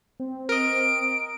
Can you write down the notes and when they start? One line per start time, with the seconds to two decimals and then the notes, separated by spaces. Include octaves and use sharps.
0.20 C4
0.49 A#4 D#5 D7